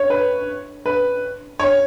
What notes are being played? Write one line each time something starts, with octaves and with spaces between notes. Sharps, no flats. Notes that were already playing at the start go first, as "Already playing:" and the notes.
Already playing: C#5
B4
B4
C#5